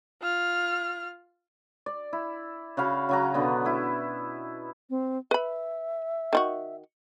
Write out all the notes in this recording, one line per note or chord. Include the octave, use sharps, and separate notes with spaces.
F4 F6
D5
E4
C#3 F#4 F5 B5
C#3 F#3 A#5
B2 D3 B3
E4 B4
C4
B4 E5 B5
D#3 F4 F#4